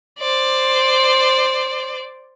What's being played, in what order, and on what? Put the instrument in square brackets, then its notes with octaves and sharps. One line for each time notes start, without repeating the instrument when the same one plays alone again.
[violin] C5 D5